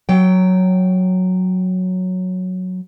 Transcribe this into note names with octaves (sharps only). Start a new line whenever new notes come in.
F#3 G5